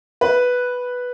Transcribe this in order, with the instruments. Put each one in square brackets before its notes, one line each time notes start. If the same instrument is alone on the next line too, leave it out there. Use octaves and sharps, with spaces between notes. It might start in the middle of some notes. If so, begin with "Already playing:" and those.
[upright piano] B4